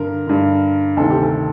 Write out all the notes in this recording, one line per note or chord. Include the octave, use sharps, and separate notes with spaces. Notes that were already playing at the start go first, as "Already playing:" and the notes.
Already playing: G2 D3 A#4
G2 D3
D2 C3 D#3 A4
G4
A4